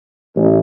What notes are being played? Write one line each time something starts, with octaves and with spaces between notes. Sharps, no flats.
A1